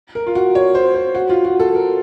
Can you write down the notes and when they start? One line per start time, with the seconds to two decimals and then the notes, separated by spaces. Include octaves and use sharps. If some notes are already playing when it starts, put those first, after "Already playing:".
0.15 A#4
0.27 F4
0.35 F#4
0.55 C#5
0.75 C5
0.95 C5
1.15 F#4
1.29 F4
1.45 F#4
1.60 A4
1.75 A#4